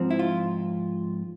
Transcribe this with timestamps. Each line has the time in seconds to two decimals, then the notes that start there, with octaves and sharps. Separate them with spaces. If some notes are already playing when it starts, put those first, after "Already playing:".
Already playing: G#2 F3 C4
0.10 E4
0.19 F4